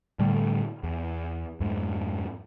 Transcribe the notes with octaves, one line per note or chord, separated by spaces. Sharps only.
A2 D3 G3 A3
E2
F2 G#2